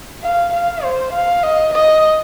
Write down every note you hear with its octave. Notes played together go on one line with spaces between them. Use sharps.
F5
F5
C5
F5
D#5
D#5